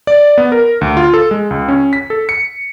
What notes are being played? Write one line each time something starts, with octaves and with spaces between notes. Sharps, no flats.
D5
B3
A#4
D2
F4
A4
G#3
C#2
C#4
B6
A4
C#7